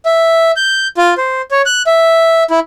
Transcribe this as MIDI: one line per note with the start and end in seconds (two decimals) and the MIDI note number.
0.06 0.52 76
0.56 0.88 91
0.97 1.14 65
1.18 1.42 72
1.51 1.62 73
1.66 1.82 90
1.87 2.44 76
2.50 2.60 64